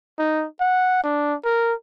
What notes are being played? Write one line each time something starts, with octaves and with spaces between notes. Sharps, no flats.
D#4
F#5
D4
A#4